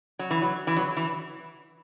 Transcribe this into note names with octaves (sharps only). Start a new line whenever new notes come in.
F#3
E3
F#3
E3
F#3
E3